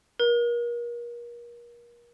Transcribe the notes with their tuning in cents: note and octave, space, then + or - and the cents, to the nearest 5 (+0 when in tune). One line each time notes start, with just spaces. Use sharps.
A#4 +35